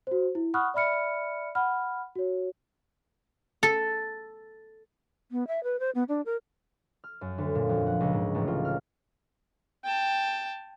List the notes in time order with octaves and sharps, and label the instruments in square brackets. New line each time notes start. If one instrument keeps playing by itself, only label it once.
[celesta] F#4 C5
E4
F#5 B5 C#6 D#6 F6 F#6
D5 E5 B5 F6 C#7
F#5 B5 F6
F#4 C#5
[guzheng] A4
[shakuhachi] B3
E5
B4
C5
B3
D4
A#4
[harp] F6
F#2
D2
A#2
F2
F#5
C#2
G#2
A1
F4
F6
[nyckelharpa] G5 A5